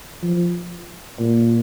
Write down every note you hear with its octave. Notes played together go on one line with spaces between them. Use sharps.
F3
A#2